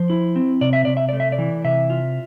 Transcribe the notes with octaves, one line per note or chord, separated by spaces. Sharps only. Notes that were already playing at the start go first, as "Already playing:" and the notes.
Already playing: F3 C5
E4
C4
C3 D5
E5
C3 D5
E5
A3 D5
E5
D5
E3
C3 E5
F4